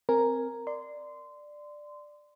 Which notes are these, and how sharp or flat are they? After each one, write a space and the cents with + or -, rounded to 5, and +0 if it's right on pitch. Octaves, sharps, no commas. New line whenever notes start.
C4 -5 A#4 +0 G#5 +0
D5 +10 C6 -20